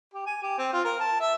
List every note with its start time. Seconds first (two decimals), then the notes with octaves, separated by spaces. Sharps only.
0.14 G4
0.26 G#5
0.42 G4
0.58 C4
0.73 F4
0.85 A#4
1.00 A5
1.20 E5